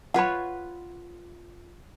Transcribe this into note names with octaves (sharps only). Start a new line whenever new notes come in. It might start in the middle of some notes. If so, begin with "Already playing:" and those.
F4 B4 C#5 F#5 B5